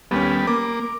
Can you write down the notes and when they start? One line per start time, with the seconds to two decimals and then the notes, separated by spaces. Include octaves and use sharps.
0.11 D#2 G3 B3 C#4
0.47 A#3 D6